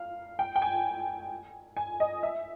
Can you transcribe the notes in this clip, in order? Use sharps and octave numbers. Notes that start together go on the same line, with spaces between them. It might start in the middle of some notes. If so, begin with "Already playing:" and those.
Already playing: F5
G5
G5
G#5
G#5
D#5
E5